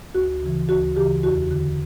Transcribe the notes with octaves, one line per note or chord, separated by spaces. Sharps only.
D2 F#4
C#3 E3
D2 F#4
C#3 E3 G4
E2 F#4
D3